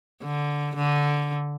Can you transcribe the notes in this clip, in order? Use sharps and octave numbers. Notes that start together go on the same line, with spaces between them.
D3
D3